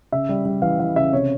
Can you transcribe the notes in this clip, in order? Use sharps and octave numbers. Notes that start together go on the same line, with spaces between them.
C#3 E5
G3
G3
E3 F5
E3 F5
C#3 E5
C3 C#5